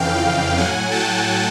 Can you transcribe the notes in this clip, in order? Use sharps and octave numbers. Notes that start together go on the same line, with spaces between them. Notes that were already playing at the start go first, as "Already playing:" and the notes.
Already playing: F2 C#3 E3 F5 G5
A2 F#3 F#5 G#5
G5 A5